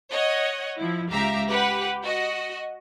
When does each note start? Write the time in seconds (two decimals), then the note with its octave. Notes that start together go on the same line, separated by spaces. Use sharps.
0.10 C#5 D#5 F#5
0.77 F3 E4
1.09 C#2 G4 E5 F5 A#5
1.49 G4 B4 F#5
2.04 F#4 D#5